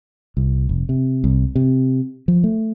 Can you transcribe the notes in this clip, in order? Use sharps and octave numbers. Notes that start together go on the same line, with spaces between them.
C2
F1
C3
C2
C3
F3
A3